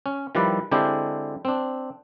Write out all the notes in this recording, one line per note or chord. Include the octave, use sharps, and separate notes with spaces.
C#4
D#3 F3 G3 E4 B4 D5
D3 G#3 C4 D4 E4 G4
C4 D4